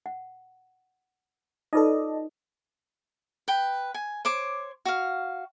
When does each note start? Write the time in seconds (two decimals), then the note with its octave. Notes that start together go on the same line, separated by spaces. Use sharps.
0.06 F#5
1.73 D#4 F4 A4 B4 D5 D#5
3.48 B4 G5
3.94 G#5
4.25 C5 C#5 D6
4.85 F#4 F5